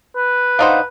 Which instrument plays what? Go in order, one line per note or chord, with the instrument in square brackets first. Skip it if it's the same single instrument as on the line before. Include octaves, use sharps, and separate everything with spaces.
[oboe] B4
[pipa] D4 D#4 C5 [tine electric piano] F5 F#5